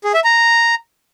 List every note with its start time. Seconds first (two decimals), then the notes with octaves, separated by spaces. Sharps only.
0.04 G#4
0.14 E5
0.24 A#5